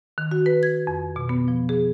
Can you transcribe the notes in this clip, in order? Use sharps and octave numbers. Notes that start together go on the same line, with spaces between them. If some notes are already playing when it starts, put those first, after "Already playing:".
D#3
F#4
B4
G#6
F2
B2
B3
F3
G#4